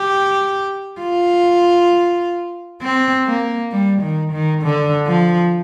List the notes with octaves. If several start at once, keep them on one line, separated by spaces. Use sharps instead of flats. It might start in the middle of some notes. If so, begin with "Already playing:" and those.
Already playing: G4
F4
C4
A#3
G3
D#3
D#3
D3
F3